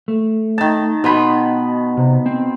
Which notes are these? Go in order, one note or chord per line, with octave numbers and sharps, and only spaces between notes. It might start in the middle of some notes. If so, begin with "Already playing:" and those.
A3
D#3 A5
B2 F#4 B5 C6
C3
C4